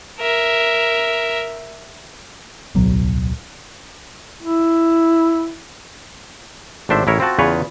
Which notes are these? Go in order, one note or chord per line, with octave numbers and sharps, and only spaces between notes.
A#4 E5
D1 B1 F#3
E4
G#1 A2 D4 C5 E5
A1 E4 A#4 C#5
C4 F4 F#4 A5
E2 C#3 F4 B4 C#5